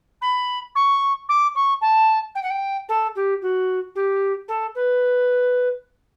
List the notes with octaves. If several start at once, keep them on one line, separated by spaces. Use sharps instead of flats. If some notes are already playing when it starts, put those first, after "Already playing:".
B5
C#6
D6
C#6
A5
G5
F#5
G5
A4
G4
F#4
G4
A4
B4